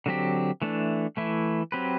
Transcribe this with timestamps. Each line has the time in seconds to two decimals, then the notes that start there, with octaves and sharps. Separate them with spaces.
0.06 D3 F#3 C4 G4
0.62 E3 A3 D4
1.17 E3 A3 E4
1.72 F#3 C4 G4 B4